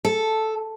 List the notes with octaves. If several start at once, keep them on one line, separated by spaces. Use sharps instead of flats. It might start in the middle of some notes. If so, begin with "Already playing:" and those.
A4